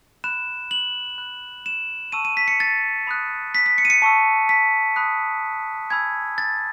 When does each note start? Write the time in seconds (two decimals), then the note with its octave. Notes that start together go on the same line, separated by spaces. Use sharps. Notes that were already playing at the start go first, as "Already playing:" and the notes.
0.24 B5 F#6 E7
0.71 F#7
1.18 B5 F#6
1.66 E7
2.12 A5 C#6 E6 D#7
2.25 D#7
2.37 B6
2.48 C#7
2.60 A6
3.07 B5 D#6 F#6
3.55 B6
3.66 B6
3.78 C#7
3.85 D#7
3.90 C#7
4.02 A5 C#6 E6
4.49 B6
4.96 B5 D#6 F#6
5.90 G#5 B5 E6 G#6
6.38 A6